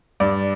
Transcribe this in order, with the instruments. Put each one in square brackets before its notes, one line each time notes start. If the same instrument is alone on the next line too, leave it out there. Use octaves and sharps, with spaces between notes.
[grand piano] G2 D5